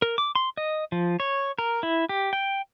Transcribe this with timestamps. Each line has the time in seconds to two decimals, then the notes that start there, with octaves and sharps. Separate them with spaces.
0.02 A#4
0.18 D6
0.35 C6
0.57 D#5
0.92 F3
1.20 C#5
1.59 A#4
1.83 E4
2.09 G4
2.33 G5